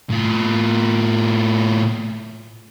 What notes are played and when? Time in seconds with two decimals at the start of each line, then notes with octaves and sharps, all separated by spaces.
0.10 A2 F4